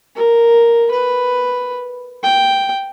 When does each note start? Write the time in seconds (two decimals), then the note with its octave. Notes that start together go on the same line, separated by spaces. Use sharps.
0.16 A#4
0.91 B4
2.23 G5